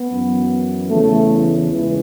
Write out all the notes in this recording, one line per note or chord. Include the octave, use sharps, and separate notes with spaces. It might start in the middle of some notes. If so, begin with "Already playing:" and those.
Already playing: B3
F#2 E3
E2 C#3 E3 A3
C#2 E3